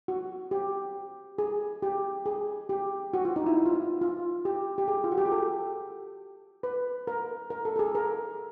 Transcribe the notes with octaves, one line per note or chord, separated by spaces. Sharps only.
F#4
G4
G#4
G4
G#4
G4
F#4
F4
D#4
E4
E4
F4
E4
F4
G4
G4
G#4
F4
F#4
G4
G#4
A4
B4
A#4
A#4
A4
A4
G#4
A#4